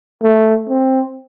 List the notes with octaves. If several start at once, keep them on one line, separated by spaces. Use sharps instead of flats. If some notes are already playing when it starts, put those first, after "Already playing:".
A3
C4